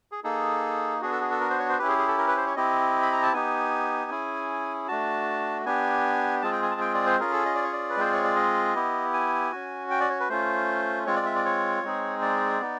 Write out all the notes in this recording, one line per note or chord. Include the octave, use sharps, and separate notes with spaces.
G#4
A#3 D#4 G#4 A4
B3 D4 F#4 G#4
A4
G#4
A4
A#4
C5
C#5
C5
C#4 E4 G4 B4
G#4
G#4
A4
A#4
B4
C5
C#5
C4 E4 G4 D#5
B5
A#5
A5
B3 D#4 G4 G#5
C#4 E4 G#4
A3 D4 F#4 A5
B3 D4 G4 G#5
G#3 C4 F4 G#4 A5
G5
G#5
A5
G5
D5
C5
C#4 F4 G#4 A#4
A4
D#5
D5
C#5
D5
B4
G#3 C4 F4 G#4 C5
C#5
D5
D#5
B3 E4 G4
G#5
C#4 F#4
G5
D5
C#5
B4
A3 C#4 F4 C5
G#3 C4 F4 C#5
D5
E5
D5
C#5
G#3 C4 D#4 G#4
D5
B3 D#4